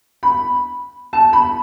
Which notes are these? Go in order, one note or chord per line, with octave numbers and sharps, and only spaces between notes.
B5
A5
B5